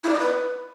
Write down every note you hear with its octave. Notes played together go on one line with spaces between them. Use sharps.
E4
D5
D#5
B4